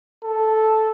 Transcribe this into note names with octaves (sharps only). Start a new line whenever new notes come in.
A4